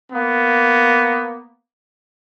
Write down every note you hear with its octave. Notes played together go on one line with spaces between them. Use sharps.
A#3 B3